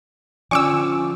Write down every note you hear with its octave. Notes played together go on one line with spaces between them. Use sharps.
D3 F3 C#4 D5 G#5 C#6 D6 E6